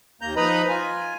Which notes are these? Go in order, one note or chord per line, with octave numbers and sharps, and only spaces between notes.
D#2 A#3 A#5 G6
F3 D#4 B4 D#5 A#5 B5
F4 G#5